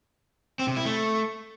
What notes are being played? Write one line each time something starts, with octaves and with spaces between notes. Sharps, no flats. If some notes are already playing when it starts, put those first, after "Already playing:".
C4
C3
E4
A3